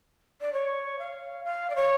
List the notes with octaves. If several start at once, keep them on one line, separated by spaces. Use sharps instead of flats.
D5
C#5
F5
F5
D5
C#5